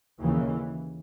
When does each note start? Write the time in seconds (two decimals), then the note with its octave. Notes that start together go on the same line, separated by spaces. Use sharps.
0.18 D#2 C#3 E3